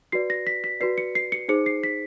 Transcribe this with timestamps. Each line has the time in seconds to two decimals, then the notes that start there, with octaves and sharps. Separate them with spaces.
0.12 F#4 B4 D5 C7
0.30 A#6
0.47 B6
0.64 B6
0.80 F#4 B4 D5 C7
0.98 C#7
1.15 C7
1.32 C#7
1.48 D#4 G#4 C5 C#7
1.66 C7
1.83 B6